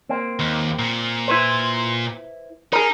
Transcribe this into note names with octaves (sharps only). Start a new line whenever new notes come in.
A#3 C4
D#2
A#2
E4 B4 C5
D#4 G#4 A#4